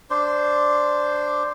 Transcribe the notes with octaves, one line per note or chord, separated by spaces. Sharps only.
D4 C5